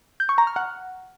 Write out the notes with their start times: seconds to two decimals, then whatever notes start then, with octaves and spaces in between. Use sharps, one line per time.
0.20 G6
0.29 C#6
0.38 A#5
0.47 F6
0.56 F#5